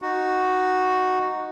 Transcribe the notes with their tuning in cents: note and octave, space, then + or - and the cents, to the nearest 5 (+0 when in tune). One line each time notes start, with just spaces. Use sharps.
D#4 +0 F#4 +0